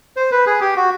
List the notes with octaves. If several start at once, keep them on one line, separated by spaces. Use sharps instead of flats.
C5
B4
G#4
G4
F#4